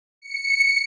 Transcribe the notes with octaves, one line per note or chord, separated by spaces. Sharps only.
C#7